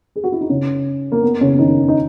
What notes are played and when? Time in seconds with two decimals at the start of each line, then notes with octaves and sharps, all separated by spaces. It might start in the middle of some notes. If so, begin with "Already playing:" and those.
0.16 G#4
0.24 F#4
0.32 E4
0.41 D#4
0.49 C#3 C#4
1.12 A#3
1.23 B3
1.41 C#3 C#4
1.58 D#3 D#4
1.88 D#4